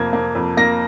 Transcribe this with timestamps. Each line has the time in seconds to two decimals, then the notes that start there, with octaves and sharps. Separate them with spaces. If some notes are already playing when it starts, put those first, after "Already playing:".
Already playing: F2 C3 A#3 G#6
0.13 A#3
0.35 F2
0.57 A#3 A#6